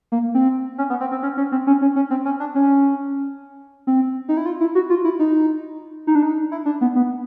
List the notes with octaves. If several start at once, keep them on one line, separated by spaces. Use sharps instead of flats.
A#3
C4
C#4
B3
C4
C4
C#4
C#4
C4
C#4
C#4
C#4
C4
C#4
D4
C#4
C4
D#4
E4
F4
E4
F#4
F4
E4
D#4
D#4
D4
D#4
E4
D4
B3
B3